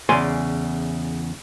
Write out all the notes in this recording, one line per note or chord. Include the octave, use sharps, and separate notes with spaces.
E2 C#3 D5 G#5 C6